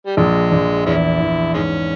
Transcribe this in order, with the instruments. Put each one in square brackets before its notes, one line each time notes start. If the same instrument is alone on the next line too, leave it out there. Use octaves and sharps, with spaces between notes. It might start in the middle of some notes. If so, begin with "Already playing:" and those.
[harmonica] G3
[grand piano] A#1 [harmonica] G#3
[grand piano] A#1
[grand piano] E2 [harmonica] G#3 C#4 E4
[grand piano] E2
[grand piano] G#2 [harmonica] G#3 C#4